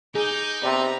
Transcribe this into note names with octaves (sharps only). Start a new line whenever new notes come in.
D#4 G#4 D6 G6
C3 B3 D5 A#5